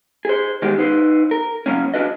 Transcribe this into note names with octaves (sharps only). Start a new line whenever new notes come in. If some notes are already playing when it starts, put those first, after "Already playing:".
G#4 C5
D#3 G3 G#3 B3 G4 G#4
D#4 B4 C5
A#4
C#3 F#3 A#3 C#4
D4 F#4 B4 D#5